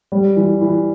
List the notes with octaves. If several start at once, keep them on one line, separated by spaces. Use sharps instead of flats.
G3
E3
E3